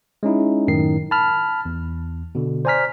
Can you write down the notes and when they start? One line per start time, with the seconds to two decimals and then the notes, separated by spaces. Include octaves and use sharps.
0.23 G#3 C#4 D#4 E4
0.68 F#2 A2 D#3 C7
1.11 A5 B5 F6
1.65 E2
2.35 B2 D3
2.65 C5 D5 G#5 A#5 F6 B6